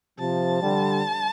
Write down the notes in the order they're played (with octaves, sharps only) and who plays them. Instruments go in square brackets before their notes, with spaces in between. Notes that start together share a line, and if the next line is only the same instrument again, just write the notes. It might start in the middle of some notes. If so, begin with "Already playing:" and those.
[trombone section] C3 F3 [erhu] A5
[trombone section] D3 G3